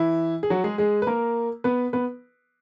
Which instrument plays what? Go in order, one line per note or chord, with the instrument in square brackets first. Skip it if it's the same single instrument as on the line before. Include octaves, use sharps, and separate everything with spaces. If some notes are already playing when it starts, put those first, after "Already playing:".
Already playing: [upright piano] E3 E4
G#4
F#3 F#4
G#3 G#4
G#3 G#4
B4
A#3 A#4
B3 B4
B3 B4